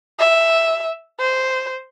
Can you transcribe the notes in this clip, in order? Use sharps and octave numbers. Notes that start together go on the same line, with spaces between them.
E5
C5